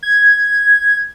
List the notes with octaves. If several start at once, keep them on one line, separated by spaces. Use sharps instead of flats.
G#6